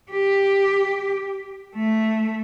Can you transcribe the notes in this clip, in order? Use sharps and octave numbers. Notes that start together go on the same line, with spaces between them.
G4
A3